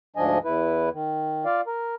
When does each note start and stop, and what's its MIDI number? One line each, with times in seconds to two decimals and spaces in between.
0.16 0.38 38
0.16 0.38 44
0.16 0.38 53
0.16 0.38 62
0.16 0.38 75
0.16 0.38 80
0.44 0.89 40
0.44 0.89 64
0.44 0.89 71
0.93 1.45 51
1.45 1.61 65
1.45 1.61 74
1.45 1.61 77
1.67 1.95 70